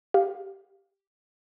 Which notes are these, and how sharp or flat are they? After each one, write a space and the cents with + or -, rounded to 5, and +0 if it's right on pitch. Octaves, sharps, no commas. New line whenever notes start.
G4 +0 F5 +10